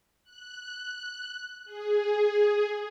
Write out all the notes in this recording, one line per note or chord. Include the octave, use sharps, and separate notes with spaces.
F#6
G#4